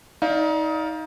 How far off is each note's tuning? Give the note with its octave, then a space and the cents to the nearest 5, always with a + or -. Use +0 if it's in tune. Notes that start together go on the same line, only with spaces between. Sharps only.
D#4 +25 D5 -5 F5 +0